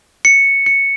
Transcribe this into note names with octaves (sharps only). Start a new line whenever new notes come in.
C#7
C#7